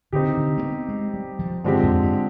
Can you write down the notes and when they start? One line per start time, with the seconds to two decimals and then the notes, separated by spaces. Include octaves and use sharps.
0.12 D3 C4 D#4 G4
0.37 D3
0.57 G#3
0.63 B3
0.88 G#3
1.14 G3
1.39 F3
1.64 G2 D3 F3 G#3 C4 G4
1.83 F2
2.02 G2